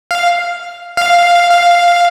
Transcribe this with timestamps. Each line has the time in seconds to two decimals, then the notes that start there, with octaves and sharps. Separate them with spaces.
0.11 F5
0.97 F5
1.50 F5